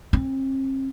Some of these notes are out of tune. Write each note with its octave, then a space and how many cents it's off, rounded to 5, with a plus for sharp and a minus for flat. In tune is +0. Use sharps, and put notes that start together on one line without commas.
C4 +40